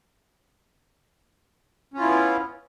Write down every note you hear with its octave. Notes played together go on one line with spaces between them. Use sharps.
B3 C#4 E4 F4